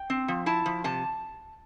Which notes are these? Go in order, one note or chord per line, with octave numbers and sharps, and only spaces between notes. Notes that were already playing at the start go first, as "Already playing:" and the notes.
Already playing: G5
C4
F3
E4 A5
F3
C3 A5